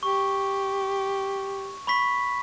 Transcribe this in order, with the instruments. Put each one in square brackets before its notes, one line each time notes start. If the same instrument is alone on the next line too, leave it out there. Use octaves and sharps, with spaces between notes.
[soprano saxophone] G4 [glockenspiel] C#6
[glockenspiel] B5 C#6 B6